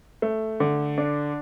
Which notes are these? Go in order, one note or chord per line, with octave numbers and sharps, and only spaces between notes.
A3
D3
D4